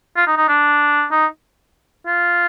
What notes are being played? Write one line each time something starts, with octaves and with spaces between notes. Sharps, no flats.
F4
D#4
D#4
D4
D#4
F4